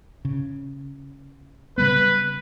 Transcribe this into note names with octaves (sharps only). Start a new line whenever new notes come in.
C#3
C#3 G3 B3 B4